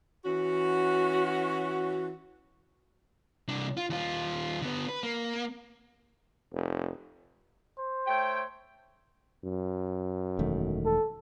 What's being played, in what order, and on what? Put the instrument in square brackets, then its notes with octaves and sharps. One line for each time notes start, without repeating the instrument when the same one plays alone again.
[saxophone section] E3 C#4 F#4
[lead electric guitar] C2 D4
F4
D#2 F4
D3 B3
B4
A#3
[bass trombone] F1
[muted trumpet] C5
[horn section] A3 C#5 G5
[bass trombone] F#2
[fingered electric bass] E1 D#3 A3
[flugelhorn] A4